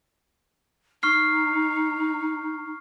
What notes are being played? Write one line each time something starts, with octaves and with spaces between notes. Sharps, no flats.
D#4 C#6 F6 C7